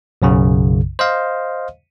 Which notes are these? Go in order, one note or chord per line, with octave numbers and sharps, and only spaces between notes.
B1 F#2 C#3
C5 D#5 F5